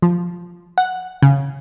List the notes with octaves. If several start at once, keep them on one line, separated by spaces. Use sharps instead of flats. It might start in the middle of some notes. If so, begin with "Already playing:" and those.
F3
F#5
C#3